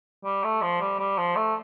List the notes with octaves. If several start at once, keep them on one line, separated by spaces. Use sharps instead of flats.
G3
A3
F3
G3
G3
F3
A3